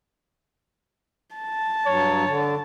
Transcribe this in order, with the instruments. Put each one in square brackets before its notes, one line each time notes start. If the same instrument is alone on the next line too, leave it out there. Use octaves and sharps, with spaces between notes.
[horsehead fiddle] A5
[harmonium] G2 F#3 [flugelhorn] C#5
[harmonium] D3